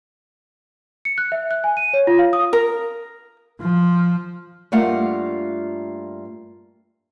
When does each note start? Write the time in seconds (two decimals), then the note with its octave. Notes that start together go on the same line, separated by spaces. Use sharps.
1.05 C#7
1.18 F#6
1.32 E5
1.51 F#6
1.64 G#5
1.77 D#7
1.94 C#5
2.07 F4
2.19 F5
2.33 D#6
2.53 A#4
3.60 F3
4.72 G2 G3 A3 A#3 F4 F#5